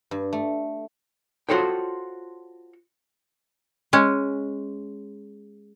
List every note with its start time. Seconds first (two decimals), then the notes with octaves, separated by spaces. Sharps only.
0.11 G2
0.33 A3
1.49 F4 F#4 A4 C5 C#5 G5
3.93 G#3 C#4